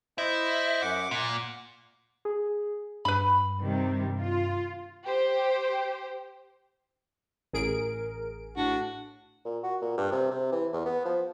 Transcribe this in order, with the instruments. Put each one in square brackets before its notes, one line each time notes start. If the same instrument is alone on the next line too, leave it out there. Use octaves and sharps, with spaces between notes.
[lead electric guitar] E4 [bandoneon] C5 D#5
[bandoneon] F#2 F#5 D6
[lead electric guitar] A#2 [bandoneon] F#5
[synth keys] G#4
[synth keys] G2 [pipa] B4 B5
[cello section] C3 D#3 G3
F4
[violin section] G4 C5
[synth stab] A1 G#4 D7 [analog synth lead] A#4
[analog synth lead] A2 [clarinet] D4 [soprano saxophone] F#4
[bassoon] A#2
F#4
A#2
G2
C3
C3
E3
E2
B3
F3